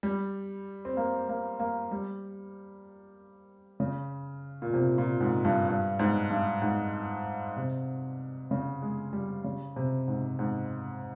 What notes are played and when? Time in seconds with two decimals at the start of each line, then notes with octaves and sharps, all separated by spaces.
0.03 G3
0.85 C4
0.97 A#3
1.29 A#3
1.59 A#3
1.91 G3
3.80 C#3
4.62 A#2
4.74 C3
4.98 A#2
5.21 G#2
5.45 G2
5.68 G2
5.99 G#2
6.30 G2
6.62 G#2
7.56 C3
8.51 C#3
8.82 G#3
9.13 G3
9.44 C#3
9.76 C3
10.08 G#2
10.39 G#2